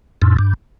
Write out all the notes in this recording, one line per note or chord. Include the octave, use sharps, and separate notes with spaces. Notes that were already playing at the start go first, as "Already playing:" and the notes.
F2 A2
G2